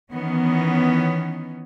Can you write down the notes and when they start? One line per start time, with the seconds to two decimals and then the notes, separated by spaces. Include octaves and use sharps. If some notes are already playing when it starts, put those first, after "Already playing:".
0.12 D#3 E3 B3 C#4